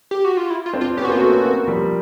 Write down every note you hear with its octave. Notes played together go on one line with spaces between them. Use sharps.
G4
F#4
F4
E4
F4
C4 D4
F4
B3 C#4 G4
F#4
A#3 C4 F4
A3 B3 F#4
B3 C#4
A#3 C4
F3 G3